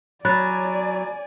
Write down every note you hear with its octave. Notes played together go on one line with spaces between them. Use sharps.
F#3 D5 G#5 B5 F#6 A6